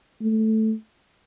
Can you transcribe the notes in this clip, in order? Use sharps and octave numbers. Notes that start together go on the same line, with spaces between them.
A3